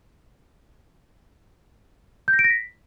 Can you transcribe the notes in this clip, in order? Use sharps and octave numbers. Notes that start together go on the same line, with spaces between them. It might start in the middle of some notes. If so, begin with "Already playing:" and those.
G6
A#6
D7
A#6
B6